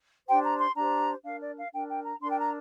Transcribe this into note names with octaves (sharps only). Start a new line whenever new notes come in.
D4 G4 C5 G5
A#5
C6
D4 G4 C5 A#5
D4 A#4 F5
D5
F5
D4 A#4 G5
G5
A#5
D4 A#4 C6
G5
A#5